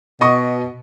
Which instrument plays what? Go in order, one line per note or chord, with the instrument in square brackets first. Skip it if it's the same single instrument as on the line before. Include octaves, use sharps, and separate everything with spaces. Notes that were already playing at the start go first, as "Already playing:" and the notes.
[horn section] B2 [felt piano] D#5 C#6 D#6